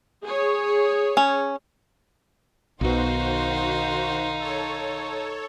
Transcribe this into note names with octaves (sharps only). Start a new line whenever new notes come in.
G#4 C#5
C#4
B1 B2 D#3 D#4 F#4 C5 F5 C6
A4 C#5